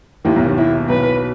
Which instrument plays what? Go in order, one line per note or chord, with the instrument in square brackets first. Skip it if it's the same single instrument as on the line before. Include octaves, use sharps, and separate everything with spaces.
[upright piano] D#2 D#3 [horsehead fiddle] E4
[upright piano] B1 B2
D#2 D#3
[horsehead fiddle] E4
[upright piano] B1 B2 [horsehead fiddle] B4